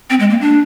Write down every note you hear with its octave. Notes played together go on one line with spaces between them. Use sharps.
C4
G#3
A#3
D4